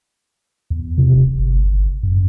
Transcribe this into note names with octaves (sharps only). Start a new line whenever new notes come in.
E2
C3
D#1
G1
F#2